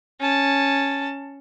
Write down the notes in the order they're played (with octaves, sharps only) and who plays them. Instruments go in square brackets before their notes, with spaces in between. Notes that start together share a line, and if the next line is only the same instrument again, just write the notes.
[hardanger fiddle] C#4 A5